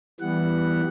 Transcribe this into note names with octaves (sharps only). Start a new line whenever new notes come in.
E3 G3 B3 F#5